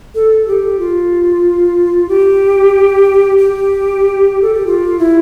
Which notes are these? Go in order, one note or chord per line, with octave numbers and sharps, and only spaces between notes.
A4
G4
F4
G4
G4
A4
G4
F4
E4